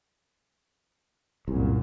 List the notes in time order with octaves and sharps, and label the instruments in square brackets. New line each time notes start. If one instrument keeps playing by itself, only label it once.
[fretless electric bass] C2 [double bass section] F#2 A#2